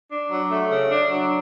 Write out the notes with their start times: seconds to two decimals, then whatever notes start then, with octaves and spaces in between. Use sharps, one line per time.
0.11 D4
0.31 F#3
0.51 A3
0.70 C#3
0.90 D4
1.10 F#3